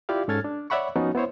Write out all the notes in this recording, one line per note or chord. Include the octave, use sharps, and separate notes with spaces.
E4 F4 G4 D5 F5
G#2 C#4 A4 F6 G#6 A6
D4
C#5 D5 E5 F#5 B5 C#6
F3 B3 C#4 D#4 F#4
B3 E4 C5 C#5